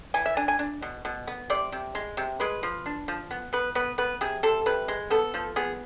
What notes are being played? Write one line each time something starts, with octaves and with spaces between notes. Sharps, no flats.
E3 G#5
E5
D4 G#5
G#5
D4
B2
B2
B3
C3 D5
C3
G#3
C3
G#3 B4
F3
D4
F3
B3
B3 B4
B3 B4
B3 B4
C3 G#4
C3 A4
C3 B4
G#3
B3 A4
F3
B3 G#4